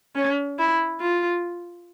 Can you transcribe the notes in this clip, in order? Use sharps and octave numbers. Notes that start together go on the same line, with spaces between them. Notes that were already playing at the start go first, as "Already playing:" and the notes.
C#4
E4
F4